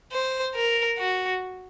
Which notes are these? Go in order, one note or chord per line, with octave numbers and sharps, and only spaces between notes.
C5
A#4
F#4